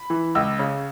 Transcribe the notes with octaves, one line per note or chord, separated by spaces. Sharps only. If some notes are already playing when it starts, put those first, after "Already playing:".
Already playing: B5
E3
C#2 E6
C#3